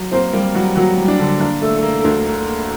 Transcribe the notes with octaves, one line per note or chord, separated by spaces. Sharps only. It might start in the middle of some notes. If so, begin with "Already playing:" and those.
Already playing: F#3
A#3 C4 C5
G3 A#3 A#4
F#3 G3 F#4
F#3 A#3 F#4
G3
D4
D3
A#3 D4
A3 A#3 A4
A4
A#3 A#4
A4
D2 A#3 A#4
A#3
A#3